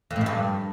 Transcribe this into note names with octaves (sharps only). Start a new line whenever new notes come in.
F2
A2
F#2
G2